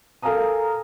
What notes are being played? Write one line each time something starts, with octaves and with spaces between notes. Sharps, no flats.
A4 A#4 F5 G#5 A#5 D#6